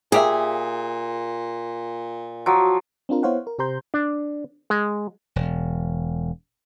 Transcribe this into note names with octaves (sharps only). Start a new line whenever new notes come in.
A#2 A#3 G4 G#4 E5
F3 F#3
C4 D4 F4 A#4
B3 E4 C5 C#5 F5 F#5
A#4
C3 G4 C5 A#5 C6 G6
D4
G#3
E1